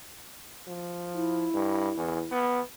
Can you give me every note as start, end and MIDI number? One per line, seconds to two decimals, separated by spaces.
0.67 1.46 53
1.14 2.31 64
1.54 1.90 43
1.97 2.22 40
2.32 2.61 59